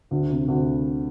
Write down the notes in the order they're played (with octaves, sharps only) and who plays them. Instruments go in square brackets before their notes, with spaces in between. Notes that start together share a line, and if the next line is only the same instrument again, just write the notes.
[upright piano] D2
C3
D2